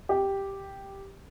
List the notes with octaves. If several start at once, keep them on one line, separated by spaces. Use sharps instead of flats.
G4